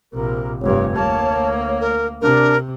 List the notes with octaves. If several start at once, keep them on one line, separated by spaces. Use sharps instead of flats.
A#1 C3 A#4
F1 G2 C#5
D2 A#3 A5
A#4
C3 D4 A#4